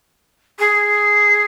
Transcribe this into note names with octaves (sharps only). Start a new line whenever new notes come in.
G#4